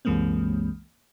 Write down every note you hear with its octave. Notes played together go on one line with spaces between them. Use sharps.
C2 F#2 E3 G#3 A#3 C4